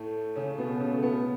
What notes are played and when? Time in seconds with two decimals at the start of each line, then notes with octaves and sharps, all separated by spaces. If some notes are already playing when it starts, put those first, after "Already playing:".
Already playing: A2 A3
0.36 C#3 C#4
0.58 B2 B3
0.80 C#3 C#4
0.91 A3
1.03 B2 B3